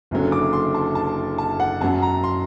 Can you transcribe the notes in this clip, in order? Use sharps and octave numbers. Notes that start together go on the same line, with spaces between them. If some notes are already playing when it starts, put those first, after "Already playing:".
F#1 F#2 D3 F#3
D6
C6
A5
A5
A5
F#5
F#2 F#3 A5
A#5
C6